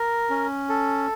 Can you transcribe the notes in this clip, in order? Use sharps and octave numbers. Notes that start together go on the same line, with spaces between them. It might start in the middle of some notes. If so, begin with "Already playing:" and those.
Already playing: A#4
C#4
A4